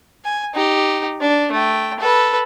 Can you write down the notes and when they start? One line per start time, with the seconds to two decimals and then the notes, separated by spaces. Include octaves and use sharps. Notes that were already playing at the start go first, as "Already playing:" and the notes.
0.25 G#5
0.54 D#4 G4
1.20 D4
1.52 A3 G5
2.00 A4 B4